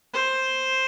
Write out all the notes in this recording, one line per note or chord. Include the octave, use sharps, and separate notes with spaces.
C5